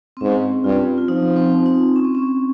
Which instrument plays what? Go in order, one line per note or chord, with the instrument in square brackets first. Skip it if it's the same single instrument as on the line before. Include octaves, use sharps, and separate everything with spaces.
[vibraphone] C4
[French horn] G#2 [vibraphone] C#4
[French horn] G2 [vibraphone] F4
[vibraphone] F4
[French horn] F3 [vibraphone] D#4
[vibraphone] C4
D#4
C#4
C4
C#4